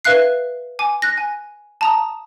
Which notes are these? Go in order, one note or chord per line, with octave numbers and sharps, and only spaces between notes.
B4 E5 F5 F#6 C7
G#5 D6
F#6 A#6
G#5
A5 A#5 D#6